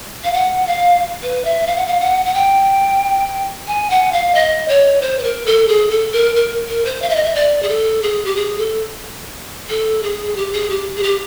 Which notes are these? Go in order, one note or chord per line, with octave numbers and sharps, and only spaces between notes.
F5
F#5
F5
B4
E5
F5
F#5
F5
F#5
F#5
G5
G#5
F#5
F5
D#5
C#5
C5
B4
A#4
A4
G#4
A4
A#4
A#4
A#4
C5
F5
E5
D#5
E5
D5
G#4
A4
G#4
G4
G#4
A4
A4
G#4
G4
G#4
G4
G#4
G4